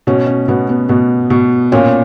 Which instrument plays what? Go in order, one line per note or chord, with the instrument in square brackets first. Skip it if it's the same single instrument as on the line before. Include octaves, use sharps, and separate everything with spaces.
[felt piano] B2 C#4
C#4
B2 B3
B3
B2 B3
B2
A#2 C#4